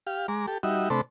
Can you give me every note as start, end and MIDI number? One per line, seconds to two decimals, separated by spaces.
0.07 0.27 67
0.07 0.27 77
0.28 0.46 56
0.28 0.46 82
0.28 0.46 86
0.47 0.58 67
0.47 0.58 69
0.63 0.89 55
0.63 0.89 63
0.63 0.89 66
0.63 0.89 76
0.90 1.01 48
0.90 1.01 57
0.90 1.01 62
0.90 1.01 69
0.90 1.01 72
0.90 1.01 83